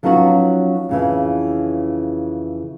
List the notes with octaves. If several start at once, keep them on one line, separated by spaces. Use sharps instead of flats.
F3 F#3 B3 C#4 D#4 F#4
F2 C#3 E3